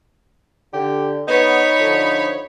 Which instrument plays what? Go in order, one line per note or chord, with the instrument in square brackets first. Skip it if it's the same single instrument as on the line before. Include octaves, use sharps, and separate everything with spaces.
[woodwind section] D3 [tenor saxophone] G4
[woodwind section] B3 [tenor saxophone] D#4 [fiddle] C#5 B5
[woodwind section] D3 F3